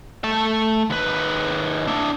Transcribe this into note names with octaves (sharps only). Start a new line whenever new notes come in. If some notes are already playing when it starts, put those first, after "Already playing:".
A3 A5
D#2 B4
D4 E4